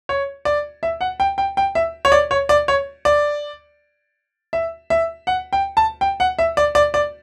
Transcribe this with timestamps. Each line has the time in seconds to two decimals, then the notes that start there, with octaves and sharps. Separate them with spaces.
0.09 C#5
0.45 D5
0.83 E5
1.01 F#5
1.20 G5
1.38 G5
1.57 G5
1.75 E5
2.05 C#5
2.12 D5
2.31 C#5
2.49 D5
2.68 C#5
3.05 D5
4.53 E5
4.90 E5
5.27 F#5
5.53 G5
5.77 A5
6.01 G5
6.20 F#5
6.39 E5
6.57 D5
6.75 D5
6.94 D5